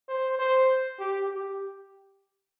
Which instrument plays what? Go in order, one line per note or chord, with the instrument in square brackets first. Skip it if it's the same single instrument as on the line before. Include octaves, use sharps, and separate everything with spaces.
[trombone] C5
C5
G4
G4